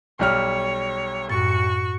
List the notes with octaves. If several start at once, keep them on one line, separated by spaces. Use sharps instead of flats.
B1 G3 C#5 F6
F#2 A2 F#4 C#6 A6